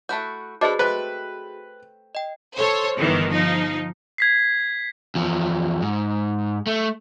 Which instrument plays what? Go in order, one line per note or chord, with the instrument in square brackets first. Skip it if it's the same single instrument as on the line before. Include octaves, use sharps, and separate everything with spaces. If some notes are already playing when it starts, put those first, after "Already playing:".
[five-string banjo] A3 E4 F#4 [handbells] F#6 G6
[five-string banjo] D4 A4 B4 [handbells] F#4 G#4 [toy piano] C5 D#5 D6
[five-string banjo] A3 C4 [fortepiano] B4 [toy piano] C5 A5
[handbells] D#5 G5
[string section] A4 C5 C#5
G1 D#3 E3
F3 D#4
[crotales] G#6 B6 C7
[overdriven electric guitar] E2 F3
G#2
A3